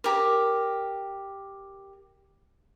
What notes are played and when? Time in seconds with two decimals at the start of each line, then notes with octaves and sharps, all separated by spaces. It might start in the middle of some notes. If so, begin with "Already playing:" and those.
0.04 G4 A#4